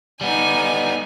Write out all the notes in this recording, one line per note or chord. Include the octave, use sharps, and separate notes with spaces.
G3 B3 D#4 G#5